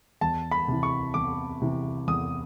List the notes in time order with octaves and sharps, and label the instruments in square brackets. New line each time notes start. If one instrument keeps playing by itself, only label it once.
[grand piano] E2 A5
B5
C3 E3
C#6
E2 D6
C3 E3
E2 D#6